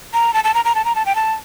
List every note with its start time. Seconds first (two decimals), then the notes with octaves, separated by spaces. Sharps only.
0.13 A#5
0.34 A5
0.44 A5
0.54 A#5
0.65 A#5
0.75 A5
0.85 A#5
0.95 A5
1.06 G5
1.15 A5